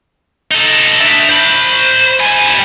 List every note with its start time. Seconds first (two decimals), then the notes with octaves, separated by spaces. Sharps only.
0.51 D#4 A4
1.01 D4 E5
1.29 C5 B5
2.20 G3 G#5